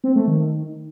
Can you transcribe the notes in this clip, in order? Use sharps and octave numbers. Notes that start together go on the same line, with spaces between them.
C4
A3
D#3